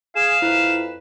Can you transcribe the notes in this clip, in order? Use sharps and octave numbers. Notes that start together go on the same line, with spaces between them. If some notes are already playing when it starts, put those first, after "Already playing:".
G#4 F5 E7
F2 E4 B4